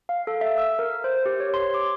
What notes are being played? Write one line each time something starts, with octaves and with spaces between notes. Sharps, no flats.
F5
A4
E5
E6
A#4
C5
G4
C#5
C6
D6